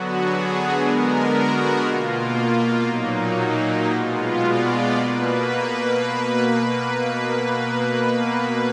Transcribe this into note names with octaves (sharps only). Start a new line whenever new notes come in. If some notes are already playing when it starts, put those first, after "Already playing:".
Already playing: D3 F#3 B3 F#4
G#4
D3 G#3 B3 A#4
F#4
B2 A#3 F4
A#2 F#3 A#3 D#4
D#4
B2 G#3 B3 F4
D5
B2 A#3 B4
B4